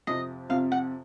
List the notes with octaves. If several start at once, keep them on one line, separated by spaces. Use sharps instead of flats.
F2 C3 F3 D#5
F2 C3 F3 F5
F#5